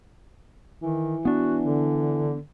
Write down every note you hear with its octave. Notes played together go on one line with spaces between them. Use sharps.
D#3 E3
B3 D4 F#4
D3